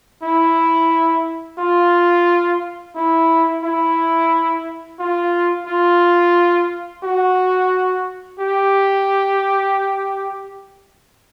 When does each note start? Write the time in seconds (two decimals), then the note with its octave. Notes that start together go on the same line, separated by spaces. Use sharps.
0.23 E4
1.59 F4
2.96 E4
3.63 E4
4.99 F4
5.67 F4
7.04 F#4
8.39 G4